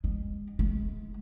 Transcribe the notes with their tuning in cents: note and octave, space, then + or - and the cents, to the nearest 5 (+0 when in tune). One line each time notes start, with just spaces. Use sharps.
G#3 -30
G#3 +20